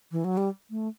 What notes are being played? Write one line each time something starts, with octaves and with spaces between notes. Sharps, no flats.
E3
F#3
G3
A3